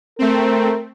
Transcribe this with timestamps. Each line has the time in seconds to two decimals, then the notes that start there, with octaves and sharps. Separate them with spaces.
0.19 A3 C4 A#4